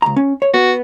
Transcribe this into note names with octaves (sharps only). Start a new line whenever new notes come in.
C#2 A#5
C#4
C#5
B3 F#4